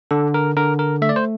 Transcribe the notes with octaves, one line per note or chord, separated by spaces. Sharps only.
D3 A4
A#4
D3 A#4
A#4
A3 E5
D5
C5